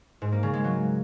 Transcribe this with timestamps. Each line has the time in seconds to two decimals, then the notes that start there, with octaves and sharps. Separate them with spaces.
0.22 G#2
0.32 A#3
0.43 C#3
0.53 G#3
0.64 F#3